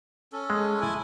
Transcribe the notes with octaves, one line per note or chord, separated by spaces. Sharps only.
C#4 A4
G#3
E4 G#5